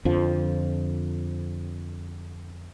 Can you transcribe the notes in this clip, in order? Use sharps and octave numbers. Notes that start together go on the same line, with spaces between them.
F2 D3 F3